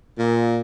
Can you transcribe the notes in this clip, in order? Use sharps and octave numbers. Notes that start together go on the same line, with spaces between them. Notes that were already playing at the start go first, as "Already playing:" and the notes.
A#2